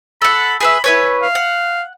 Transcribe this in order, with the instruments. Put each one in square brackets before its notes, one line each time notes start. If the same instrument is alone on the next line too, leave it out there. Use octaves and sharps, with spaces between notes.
[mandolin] A4 F#5 [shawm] B5
[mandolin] G#4 B4 E5 [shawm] B5
[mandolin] E4 B4 C#5 [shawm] G#5
[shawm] F5
[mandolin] F#5